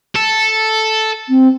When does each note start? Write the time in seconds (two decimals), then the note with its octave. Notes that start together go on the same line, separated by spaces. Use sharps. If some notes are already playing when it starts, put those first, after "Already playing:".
0.15 A4
1.29 C4